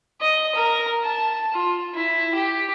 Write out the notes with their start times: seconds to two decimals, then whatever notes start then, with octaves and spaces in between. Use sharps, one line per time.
0.21 D#5
0.55 A#4
1.03 A5
1.54 F4
1.94 E4
2.34 G4